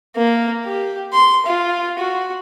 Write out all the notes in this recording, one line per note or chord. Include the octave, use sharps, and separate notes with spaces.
A#3
G4
C6
F4
F#4